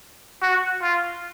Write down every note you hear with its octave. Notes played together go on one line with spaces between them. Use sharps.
F#4
F4